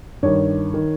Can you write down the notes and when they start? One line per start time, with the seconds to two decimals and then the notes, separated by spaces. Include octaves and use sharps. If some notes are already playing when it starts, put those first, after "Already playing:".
0.23 G2 D#3 C#5
0.74 D#3